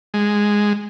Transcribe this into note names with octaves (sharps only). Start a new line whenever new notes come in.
G#3